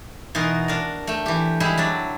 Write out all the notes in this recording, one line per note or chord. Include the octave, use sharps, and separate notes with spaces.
B2 E3 D#4 F#4 A#4 C6
D4 A#4
A3 G5
E3 G4
G3 G#3 E4 G4
F#3 D4 D5